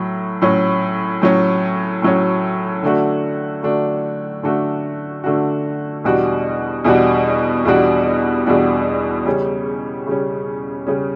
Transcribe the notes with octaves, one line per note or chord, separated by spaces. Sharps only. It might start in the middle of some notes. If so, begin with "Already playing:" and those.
Already playing: A2 F#3
A2 F#3 C#4
A2 F#3 C#4
A2 F#3 C#4
D3 A3 D4 F#4
D3 A3 D4 F#4
D3 A3 D4 F#4
D3 A3 D4 F#4
E2 B2 G3 D4 F#4
E2 B2 G3 D4 F#4
E2 B2 G3 D4 F#4
E2 B2 G3 D4 F#4
C#3 G3 C#4
C#3 G3 C#4
C#3 G3 C#4